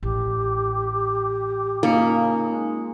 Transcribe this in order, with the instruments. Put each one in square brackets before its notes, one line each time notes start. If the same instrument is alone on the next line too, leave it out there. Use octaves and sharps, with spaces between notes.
[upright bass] A1 [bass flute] G4
[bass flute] C#3 [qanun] A#3 [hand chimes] D#4 F4 C#7
[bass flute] G#3